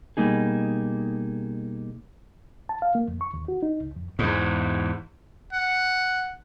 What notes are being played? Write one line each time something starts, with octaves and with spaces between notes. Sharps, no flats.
B2 G3 A#3 D#4 G#4
A5
F5
A#3
F2
C#6
D#2
F#4
D#4
C#2
F2
E2 G#2
F#5